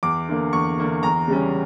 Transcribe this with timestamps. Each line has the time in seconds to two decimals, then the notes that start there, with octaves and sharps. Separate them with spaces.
0.03 E2 D6
0.29 D3 A#3
0.53 E2 C#6
0.78 D3 A#3
1.03 E2 A#5
1.28 C#3 G3 C#4